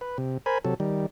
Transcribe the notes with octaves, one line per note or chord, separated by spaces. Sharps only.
B4
C3
A#4 C5 G#5 B5
C3 F#3 A4
D#3 G3